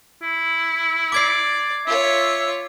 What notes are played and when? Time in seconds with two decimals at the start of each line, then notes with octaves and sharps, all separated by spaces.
0.22 E4
1.12 D5 D6 G#6 C7
1.87 F4 C#5 E5